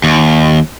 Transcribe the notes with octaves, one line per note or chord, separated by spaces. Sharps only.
D#2